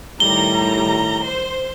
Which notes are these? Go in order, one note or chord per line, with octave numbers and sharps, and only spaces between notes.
A2 D#3 G3 A#5 G7
C5